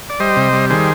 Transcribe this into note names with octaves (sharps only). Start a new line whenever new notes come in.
D5
G3 C5 D#5
C3
G3
D#3 G#4 C5